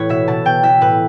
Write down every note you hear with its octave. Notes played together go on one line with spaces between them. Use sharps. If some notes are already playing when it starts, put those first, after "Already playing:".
Already playing: A2 E3 E4 B4 C#5
B2 E5
B2 A5
B2 G5
E3 E5
A2 B4